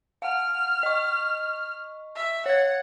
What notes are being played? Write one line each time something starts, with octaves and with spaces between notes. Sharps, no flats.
F5 F#5 F6
D#5 C#6
E5
C#5 F#5 G#6